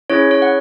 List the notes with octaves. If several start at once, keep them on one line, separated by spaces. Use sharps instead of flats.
C#4 E4 G#4 C#5
C#5
F#5